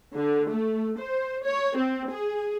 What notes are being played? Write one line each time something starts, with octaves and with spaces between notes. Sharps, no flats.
D3
A3
C5
C#5
C4
G#4